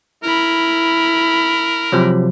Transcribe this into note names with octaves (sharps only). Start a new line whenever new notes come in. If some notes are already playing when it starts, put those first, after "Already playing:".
E4 A#4 B5
C3 F3 F#3